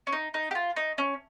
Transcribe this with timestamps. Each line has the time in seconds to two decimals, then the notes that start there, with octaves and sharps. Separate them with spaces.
0.07 C#4
0.13 D#4
0.34 D#4
0.51 G4
0.55 F4
0.76 D#4
0.98 C#4